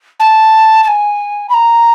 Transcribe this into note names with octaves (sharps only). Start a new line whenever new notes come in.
A5
A5
G#5
B5
A#5